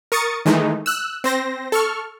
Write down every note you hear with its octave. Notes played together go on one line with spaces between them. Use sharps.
A#4 C#6 D#6 A6 C#7
D#3 E3 G#3 A3 D#4
E6 F#6
C4 C5 A#6
A4 C#6 F6